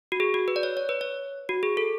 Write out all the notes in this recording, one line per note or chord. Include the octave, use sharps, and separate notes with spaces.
F#4
G#4
F#4
B4
D5
C#5
C#5
B4
C#5
F#4
G#4
A4